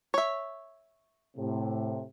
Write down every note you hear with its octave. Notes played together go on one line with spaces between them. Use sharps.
C#5 E5
A2 C3